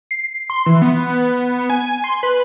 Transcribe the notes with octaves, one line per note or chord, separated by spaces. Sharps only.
C7
C6
E3
B3
G#5
C6
B4